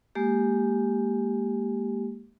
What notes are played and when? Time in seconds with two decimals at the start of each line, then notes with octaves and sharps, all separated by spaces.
0.15 G#3 A#3 G4